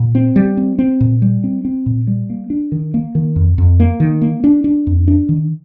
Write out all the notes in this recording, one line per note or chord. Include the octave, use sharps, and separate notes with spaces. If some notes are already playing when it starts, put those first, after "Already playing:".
Already playing: A#2
C4
G3
C4
C4
A#2
G3
C4
C4
A#2
G3
A#3
D4
D#3
A#3
D#3
F2
F2
A#3
D#3
A#3
D4
D4
F2
D4
D#3